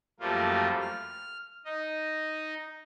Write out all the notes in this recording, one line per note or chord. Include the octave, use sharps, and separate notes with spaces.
F#2 F3 G3 A3 A#3 F4
F6
D#4 D#5